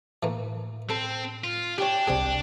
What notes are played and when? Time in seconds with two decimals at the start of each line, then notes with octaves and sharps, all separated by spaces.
0.23 A2 E3 A3 A#3
0.90 C4 A4 B5
1.44 F4
1.78 D4 G4 C#5 G5
2.07 G1 C2 C3 G3 C4 G#4